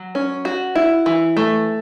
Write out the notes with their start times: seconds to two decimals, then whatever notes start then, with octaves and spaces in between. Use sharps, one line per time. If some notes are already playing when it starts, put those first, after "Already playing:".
Already playing: F#3
0.15 C#4
0.45 F#4
0.75 E4
1.06 E3
1.37 A3